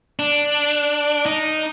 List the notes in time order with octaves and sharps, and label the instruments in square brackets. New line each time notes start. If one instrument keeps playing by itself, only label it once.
[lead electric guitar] D4
D#4